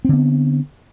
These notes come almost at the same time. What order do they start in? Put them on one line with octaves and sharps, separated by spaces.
C4 D3 B3